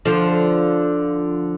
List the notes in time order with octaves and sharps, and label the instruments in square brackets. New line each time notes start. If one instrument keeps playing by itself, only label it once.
[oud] D3 F3